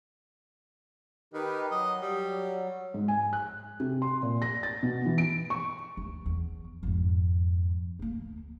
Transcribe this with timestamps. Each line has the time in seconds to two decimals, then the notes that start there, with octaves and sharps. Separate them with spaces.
1.34 D#3 D#4 G4 B4
1.71 F#3 D#5
2.02 F#3 G3
2.94 G#2
3.08 G#5
3.33 F#6
3.80 C3
4.02 C6
4.23 A#2
4.42 A#6
4.63 A6
4.83 B2
5.06 E3
5.18 D7
5.50 C#6
5.97 D#2
6.26 E2
6.83 F2 G#2
7.99 D2 A#3